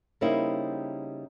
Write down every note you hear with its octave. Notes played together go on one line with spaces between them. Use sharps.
C#3 G3 A#3 C4 D#4 E4